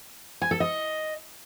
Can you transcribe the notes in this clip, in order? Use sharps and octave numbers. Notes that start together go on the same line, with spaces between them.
G#5
A4
D#5